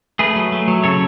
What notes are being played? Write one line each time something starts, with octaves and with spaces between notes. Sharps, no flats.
A3 G#4 B4
F#3
A3
F#3
C#3 A4 C#5